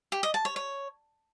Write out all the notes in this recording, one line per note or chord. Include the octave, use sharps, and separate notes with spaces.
G4
D#5
A5
C#5
C#5